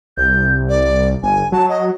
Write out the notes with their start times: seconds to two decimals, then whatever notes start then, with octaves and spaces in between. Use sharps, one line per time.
0.17 C2 G6
0.69 D5
1.23 G1 G#5
1.52 F#3 A5
1.69 D#5